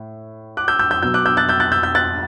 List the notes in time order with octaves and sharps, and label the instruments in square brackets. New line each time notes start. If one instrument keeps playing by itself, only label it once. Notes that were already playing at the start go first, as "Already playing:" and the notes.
Already playing: [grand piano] A2
D6 F#6
E6 G6
E6 G6
E6 G6
B2 F#3 B3 E6 G6
D6 F#6
E6 G6
F#6 A6
E6 G6
F#6 A6
E6 G6
E6 G6
F#6 A6